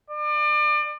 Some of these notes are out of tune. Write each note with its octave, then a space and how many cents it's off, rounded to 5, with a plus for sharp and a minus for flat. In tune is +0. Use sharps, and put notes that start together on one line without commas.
D5 +35